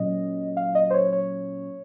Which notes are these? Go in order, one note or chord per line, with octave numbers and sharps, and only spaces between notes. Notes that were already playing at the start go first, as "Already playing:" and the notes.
Already playing: A#2 F#3 C#4 D#5
F5
D#5
C5
C#5
C#5